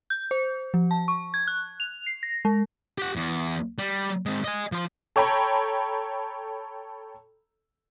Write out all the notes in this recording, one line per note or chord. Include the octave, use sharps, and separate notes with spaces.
G6
C5
F3
A5
C#6
G#6
F#6
F7
C7
A#6
G#3
G4 F#5
E2
G3
G#3 C4
D#5 G#5
F3 C6
A4 C#5 G5 A#5 B5